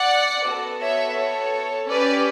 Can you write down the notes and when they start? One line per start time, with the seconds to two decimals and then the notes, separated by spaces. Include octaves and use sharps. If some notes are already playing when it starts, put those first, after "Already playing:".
Already playing: D5 F#5
0.45 B3 F#4 A4
0.80 C#5 E5
1.16 A4 C#5
1.88 C#4 G4 B4 D5